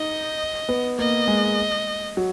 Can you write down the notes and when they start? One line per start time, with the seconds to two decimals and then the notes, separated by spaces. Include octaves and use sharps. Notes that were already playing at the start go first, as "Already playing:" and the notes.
Already playing: D#4 D#5
0.69 B3
0.98 A#3 D#5
1.28 G#3
2.17 F#3